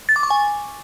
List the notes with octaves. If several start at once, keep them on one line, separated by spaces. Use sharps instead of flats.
A6
D6
C#6
G#5